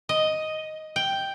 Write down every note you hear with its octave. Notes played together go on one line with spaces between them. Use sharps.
D#5
G5